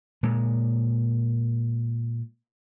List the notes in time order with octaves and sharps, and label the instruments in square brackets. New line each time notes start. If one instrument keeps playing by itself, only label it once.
[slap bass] A#2 G#3